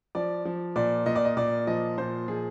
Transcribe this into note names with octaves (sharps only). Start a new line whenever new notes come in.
F3 D5
F3
A#2 D5
A#2 D#5
D5
D#5
A#2 D5
F3 D#5
A#2 C5
F3 G#4